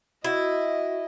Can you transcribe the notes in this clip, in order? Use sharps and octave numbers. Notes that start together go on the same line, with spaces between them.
E4 F#4 D#5